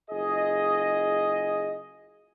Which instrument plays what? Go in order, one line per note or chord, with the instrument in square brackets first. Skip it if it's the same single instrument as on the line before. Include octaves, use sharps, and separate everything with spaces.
[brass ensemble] F#1 F4 G#4 D#5